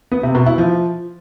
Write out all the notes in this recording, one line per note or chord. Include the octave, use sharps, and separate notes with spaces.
B3
C3
B2
E4
F3